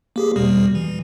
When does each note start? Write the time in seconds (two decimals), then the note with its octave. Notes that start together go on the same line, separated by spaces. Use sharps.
0.16 A#3 G4 G#4
0.36 E2 B2 G3
0.75 E3